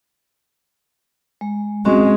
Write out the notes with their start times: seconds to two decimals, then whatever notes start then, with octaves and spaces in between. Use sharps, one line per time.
1.41 G#3
1.85 G#3 C4 C#4 F#4